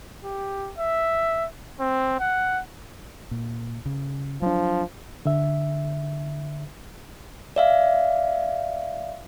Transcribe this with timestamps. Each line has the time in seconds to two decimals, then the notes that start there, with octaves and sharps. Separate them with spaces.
0.24 G4
0.79 E5
1.80 C4
2.20 F#5
3.31 A#2
3.86 C#3
4.42 F3 F#3 D4
5.25 D3 E5
7.56 D5 E5 F5